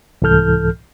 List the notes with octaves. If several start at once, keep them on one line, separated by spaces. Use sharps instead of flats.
C2 G#2 E3 A4 F6 G6